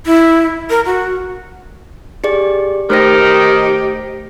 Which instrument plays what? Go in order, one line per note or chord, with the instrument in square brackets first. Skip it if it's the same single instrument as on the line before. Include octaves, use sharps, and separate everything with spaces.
[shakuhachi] E4
A#4
F#4
[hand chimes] G4 G#4 D5
[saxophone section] D#3 [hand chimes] A3 C5 A#6 [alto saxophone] G4